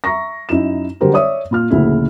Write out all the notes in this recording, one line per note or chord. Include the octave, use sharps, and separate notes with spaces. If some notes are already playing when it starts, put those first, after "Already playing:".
E5 A#5 C#6 A#6
F#2 D#4 E4 E7
D3 F#3 G3 G4 A#4 C5
C#5 D5 E5 D#6
A#2 F4 F6
F#1 D2 A#2 C#3 E4